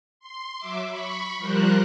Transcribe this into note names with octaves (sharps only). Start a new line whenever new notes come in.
C6
F#3 E5 D6
B5 C#6
F3 G3 A#4 C5 F#6